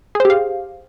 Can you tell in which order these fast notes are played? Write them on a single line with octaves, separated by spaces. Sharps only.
G#4 C5 G4 F5